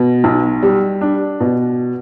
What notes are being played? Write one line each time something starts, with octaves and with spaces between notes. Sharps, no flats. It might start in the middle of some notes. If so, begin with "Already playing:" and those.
Already playing: B2
B1
G3
D4
B2